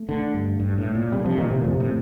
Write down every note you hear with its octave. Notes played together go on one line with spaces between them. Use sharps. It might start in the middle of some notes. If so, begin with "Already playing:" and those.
Already playing: A3
D3
G2
G2
A2
A#2
C3 G3
D3
C3 F3
A#2 D#3
A2 C3
F2 A#2
C3
A2